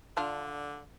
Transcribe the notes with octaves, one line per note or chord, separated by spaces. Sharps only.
D3 D4 F4